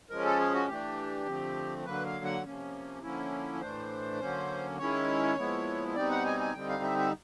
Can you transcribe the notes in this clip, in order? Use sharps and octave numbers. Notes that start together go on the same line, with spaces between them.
F3 G#3 C#4 A#4
A4
G#4
F#4
E3 A3 D4 G4
D3 F3 A3 C4
D3 F#3 A#3 B4
F5
F#5
C3 F3 A#3 C#4
D3 F3 A#3 C#4 E4
A2 E3 A3 D4 C5
D3 F#3 A#3 C#4
D#3 G#3 C#4 E4 C#5
A#2 F3 G#3 B3 E4
B2 G3 C4 D#4 D5
F#5
G#5
G#5
D3 G3 C4 D#4 G5
F5
E5
E5